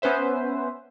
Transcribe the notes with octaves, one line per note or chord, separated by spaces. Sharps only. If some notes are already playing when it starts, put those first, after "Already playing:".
B3 C#4 B4 C5 E5